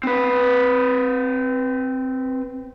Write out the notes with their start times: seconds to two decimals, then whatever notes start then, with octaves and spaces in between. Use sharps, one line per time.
0.03 C4 B4